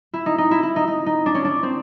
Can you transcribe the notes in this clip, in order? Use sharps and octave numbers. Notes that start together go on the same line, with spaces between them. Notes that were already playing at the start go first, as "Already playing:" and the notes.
E4
D#4
D#4
E4
E4
D#4
D#4
D#4
D4
C#4
D4
C4